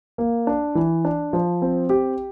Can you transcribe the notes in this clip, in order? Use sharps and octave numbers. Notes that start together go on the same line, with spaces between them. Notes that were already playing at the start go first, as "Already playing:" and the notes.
A#3
D4
E3
D4
F3
C4
G4